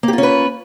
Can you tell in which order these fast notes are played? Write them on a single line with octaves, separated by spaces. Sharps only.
A#3 G4 F4 C#4 B4